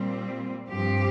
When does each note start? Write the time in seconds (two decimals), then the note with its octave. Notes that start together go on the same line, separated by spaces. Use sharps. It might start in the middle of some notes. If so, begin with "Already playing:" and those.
Already playing: A#2 G3 C4
0.69 G2 F3 C4 G4